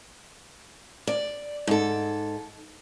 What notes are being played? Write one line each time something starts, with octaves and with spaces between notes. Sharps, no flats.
D5
G#2 A4